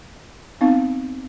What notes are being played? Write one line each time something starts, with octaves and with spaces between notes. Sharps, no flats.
B3 C4 D#4 F5